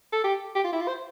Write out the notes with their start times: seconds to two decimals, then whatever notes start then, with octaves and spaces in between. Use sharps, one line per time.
0.13 A4
0.24 G4
0.55 G4
0.64 F4
0.73 E4
0.81 F4
0.88 C5